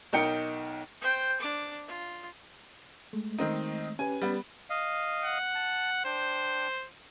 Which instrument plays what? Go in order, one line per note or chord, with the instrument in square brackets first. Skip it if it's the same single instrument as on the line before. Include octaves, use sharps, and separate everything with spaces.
[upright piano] B1 D#4 A#4 G5 C#7
[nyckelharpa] C5 G5
D4 D6
F4
[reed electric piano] G#3 A3
[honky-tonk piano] D#3 C4 D#4
[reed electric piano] C#4 G4 B4 [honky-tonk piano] G#5
[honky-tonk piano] G3 B3
[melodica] D#5 F5
[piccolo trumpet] F#5
[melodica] A5
[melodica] D4 G5 [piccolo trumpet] C5